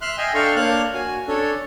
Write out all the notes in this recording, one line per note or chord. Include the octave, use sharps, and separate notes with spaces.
E5 C6 F6 F#6
D#5 E5 G5 G#5
D4 A4 F5 G5 C6 C#6
A#3 D4 C#5 F5 F#6
F#4 G#5
C#4 D4 A4 C#5